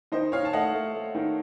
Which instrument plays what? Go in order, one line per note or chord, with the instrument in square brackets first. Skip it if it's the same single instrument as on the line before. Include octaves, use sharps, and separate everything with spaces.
[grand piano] D#3 [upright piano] C5 D#5
[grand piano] D#3 [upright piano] C#5 F5
[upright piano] A5
[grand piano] A3 [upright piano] D#5 F#5
[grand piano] A3
A3
D#3